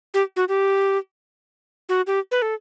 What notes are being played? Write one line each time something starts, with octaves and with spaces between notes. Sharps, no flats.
G4
F#4
G4
F#4
G4
B4
A4